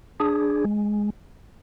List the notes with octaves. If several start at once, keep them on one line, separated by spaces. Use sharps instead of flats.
D4 G#4
G#3